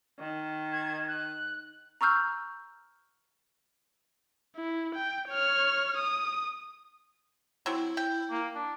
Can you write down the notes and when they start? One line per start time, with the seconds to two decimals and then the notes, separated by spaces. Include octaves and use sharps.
0.19 D#3
0.73 G#6
1.08 F#6
2.01 A#5 C#6 E6 F6 G6
4.56 E4
4.95 G5
5.29 C#5 F6
5.97 D#6
7.66 F#3 C4 E4
7.97 G5
8.31 A#3
8.55 D4